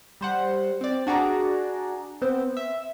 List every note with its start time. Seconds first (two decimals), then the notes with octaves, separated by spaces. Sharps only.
0.21 G3 C5 F#5
0.81 C4 D5
1.07 D4 F#4 G#4 D5 A#5
2.22 B3 C4 C5
2.57 E5